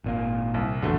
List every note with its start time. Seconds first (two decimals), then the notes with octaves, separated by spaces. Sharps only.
0.04 G#1 A#2 A#3
0.54 C2
0.82 E1 A1 E2 D3 A3